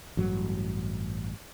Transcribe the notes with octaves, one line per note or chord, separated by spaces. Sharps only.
A1 G2 F#3